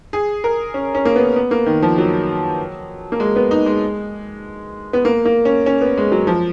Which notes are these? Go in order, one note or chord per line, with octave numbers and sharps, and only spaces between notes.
G#4
A#4
C#4
C#4
A#3
B3
B3
A#3
D#3
F3
F#3
A#3
G#3
B3
D#4
G#3
B3
A#3
A#3
C#4
C#4
B3
G#3
F#3
F3